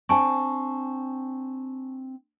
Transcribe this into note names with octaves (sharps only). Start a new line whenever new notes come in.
C4 D4 C5 G#5 A5 C#6